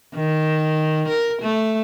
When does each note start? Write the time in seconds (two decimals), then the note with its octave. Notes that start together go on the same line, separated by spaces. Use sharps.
0.15 D#3
1.08 A#4
1.42 A3